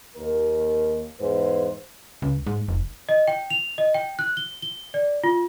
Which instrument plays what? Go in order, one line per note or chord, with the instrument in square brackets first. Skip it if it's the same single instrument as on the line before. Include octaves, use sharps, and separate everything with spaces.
[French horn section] D#2 A#4
E2 G#2 B4 C5
[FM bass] C#2
G#2
F1
[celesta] D#5
G5
F7
D#5
G5
F#6
G7
G7
D5
F4